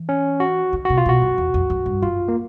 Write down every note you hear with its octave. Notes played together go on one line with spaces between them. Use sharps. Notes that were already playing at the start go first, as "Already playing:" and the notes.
Already playing: E3
C#4
F#4
D#3
C3 F#4
F4
B2 F#4
F#2
E2
F2
F#2
G2
F#2 F4
A#3